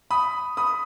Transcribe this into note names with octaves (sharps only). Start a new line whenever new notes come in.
B5 D#6
B5 D#6